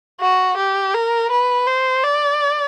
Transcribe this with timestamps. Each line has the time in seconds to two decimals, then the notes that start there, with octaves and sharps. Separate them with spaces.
0.21 F#4
0.57 G4
0.94 A#4
1.31 B4
1.67 C5
2.04 D5